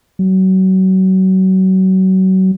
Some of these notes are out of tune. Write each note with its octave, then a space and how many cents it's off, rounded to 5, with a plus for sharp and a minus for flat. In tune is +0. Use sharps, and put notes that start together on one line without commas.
F#3 +30